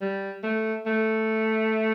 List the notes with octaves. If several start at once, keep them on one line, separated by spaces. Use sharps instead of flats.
G3
A3
A3